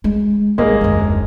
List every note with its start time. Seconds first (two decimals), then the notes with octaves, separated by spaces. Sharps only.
0.04 G#3
0.58 G1 G#3 A#3
0.81 F#1 D#2